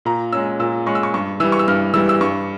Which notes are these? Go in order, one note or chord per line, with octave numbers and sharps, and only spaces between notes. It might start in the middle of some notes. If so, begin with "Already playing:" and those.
A#2 A#5
G#3 C#4 E6
A#2 E6
G#3 C#4 C#6
E6
C#6
G2 C#6
E3 G3 E6
C#6
E6
G2 F6
E3 G3 E6
E6
G2 C#6